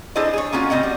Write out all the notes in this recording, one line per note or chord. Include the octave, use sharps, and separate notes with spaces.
D4 E4 G#4 A4 C5 D#5
G#4 C#5
A#3 C#4 F4 F#4
A2 C#3 C4 D#5 F#5
G3